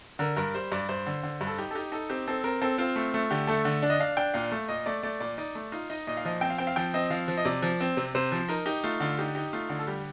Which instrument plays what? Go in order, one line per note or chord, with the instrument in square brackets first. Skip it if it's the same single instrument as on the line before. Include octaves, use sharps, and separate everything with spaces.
[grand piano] D3 A#4
G2 A#4
G3 C5
G2 D5
G2 C5
D3
D3
G2
A4
D#4 G4
A4
D#4 G4
D#4 A4
C4 G4
C4 A4
C4 A#4
C4 A4
C4 F4
A3
A3
D3 G4
A3 A4
D3
D4
D#5
D4 F5
D4 G5
A#2 F5
A3
A#2 D#5
A3 D5
A3 D5
A#2 D5
D#4 D5
A3
D#4 F4
D#4 D#5
A#2 D#5
F5
F3 D#5
C4 G5
F5
C4 G5
F5
F3 G5
C4 D#5
F3 F5
F3
D#5
C3 D5
F3
C4
C3
C3 C5
F3
D#4 A#4
D#4 G4
A3 F4
D3 F4
D#4 G4
D#4 G4
A3 F4
D3
A4
G3 G4